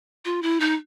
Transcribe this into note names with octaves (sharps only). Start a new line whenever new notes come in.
F4
E4
D#4